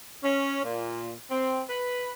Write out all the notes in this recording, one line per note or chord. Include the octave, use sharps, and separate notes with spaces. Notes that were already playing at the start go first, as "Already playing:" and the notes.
C#4
A#2
C4
B4